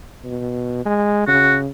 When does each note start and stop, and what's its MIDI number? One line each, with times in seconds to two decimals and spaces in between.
0.25 0.81 47
0.86 1.26 56
1.28 1.69 49
1.28 1.56 66